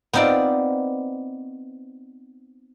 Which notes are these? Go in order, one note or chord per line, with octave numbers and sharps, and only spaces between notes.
B3 C4 D#4 F4 D5